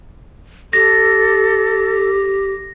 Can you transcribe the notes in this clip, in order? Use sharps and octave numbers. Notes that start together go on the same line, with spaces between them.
G4 A4 A#6